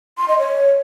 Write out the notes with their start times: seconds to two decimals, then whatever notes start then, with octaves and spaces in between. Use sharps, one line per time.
0.18 C6
0.28 D#5
0.39 C#5